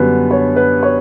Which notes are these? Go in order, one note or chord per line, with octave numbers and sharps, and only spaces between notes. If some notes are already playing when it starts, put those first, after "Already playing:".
Already playing: F#2 D3 G3 B3 D4 B4
C#5
B4
C#5